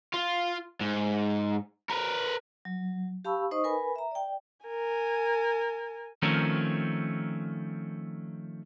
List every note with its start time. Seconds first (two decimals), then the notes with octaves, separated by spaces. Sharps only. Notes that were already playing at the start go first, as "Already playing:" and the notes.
0.13 F4
0.81 G#2
1.90 A#4 B4
2.65 F#3
3.25 G4 F5 A5 B5 C#6 E6
3.51 D#4 C5 D#5 C#6 D#6
3.64 A#4 B4 G#5 B5
3.96 E5 A#5
4.11 D5 G5
4.66 A#4 G#5
6.22 D#3 F3 A3 C4 C#4 A#4